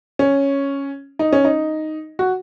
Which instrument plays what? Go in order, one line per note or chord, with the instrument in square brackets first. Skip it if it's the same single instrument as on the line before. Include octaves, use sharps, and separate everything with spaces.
[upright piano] C#4
D#4
C#4
D#4
F#4